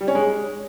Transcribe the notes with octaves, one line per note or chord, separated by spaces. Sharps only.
G3
C#4
G#3